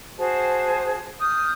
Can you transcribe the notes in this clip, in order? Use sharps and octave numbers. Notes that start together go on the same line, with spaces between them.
F#4 G#4 C5 A5
D#6 F6 G6